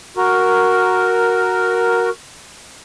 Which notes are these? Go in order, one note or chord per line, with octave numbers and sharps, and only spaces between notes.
F#4 A#4